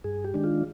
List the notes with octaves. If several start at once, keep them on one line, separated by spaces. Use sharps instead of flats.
G2 G#4
G4
D#3 G#3 D4
F4